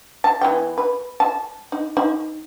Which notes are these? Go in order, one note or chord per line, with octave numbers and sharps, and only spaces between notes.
A5
E3 B3 G5
B4
A5
D#4
D#4